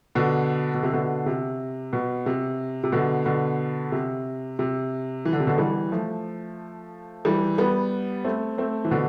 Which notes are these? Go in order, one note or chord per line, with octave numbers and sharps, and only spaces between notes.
B2 D3
B2
C3
B2 D3
C3
B2
C3
C3
B2 D3
B2 D3
C3
C3
E3
D3
C3
B2 D3
E3 G3
F3 A3
E3 G3
G3 B3
A3 C4
A3 C4
E3
B2 D3